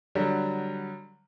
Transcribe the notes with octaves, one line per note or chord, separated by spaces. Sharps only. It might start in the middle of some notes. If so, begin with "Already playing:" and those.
D3 F#3 G3